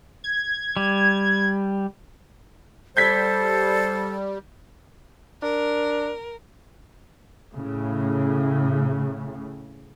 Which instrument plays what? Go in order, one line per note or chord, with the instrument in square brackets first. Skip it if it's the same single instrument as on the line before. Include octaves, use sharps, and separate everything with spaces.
[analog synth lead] G#6
[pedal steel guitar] G3
[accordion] G3 [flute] A4 [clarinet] C5 [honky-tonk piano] G6 G#6 B6
[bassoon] D4 [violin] A#4
[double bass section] A2 C#3